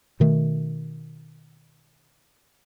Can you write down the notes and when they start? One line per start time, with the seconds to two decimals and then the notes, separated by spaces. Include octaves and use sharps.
0.20 B2 D#3 A3